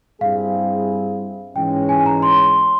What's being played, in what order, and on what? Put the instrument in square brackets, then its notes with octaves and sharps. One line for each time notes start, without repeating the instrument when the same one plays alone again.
[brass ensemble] G2 G3 C4 E4 G#4 [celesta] F5
[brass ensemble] G#2 E3 G#3 C#4 [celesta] G5
[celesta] G#5
A#5
C6